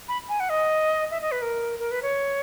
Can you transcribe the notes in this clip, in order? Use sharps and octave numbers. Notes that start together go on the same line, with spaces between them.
B5
G#5
F#5
D#5
E5
D#5
B4
A#4
A#4
B4
C#5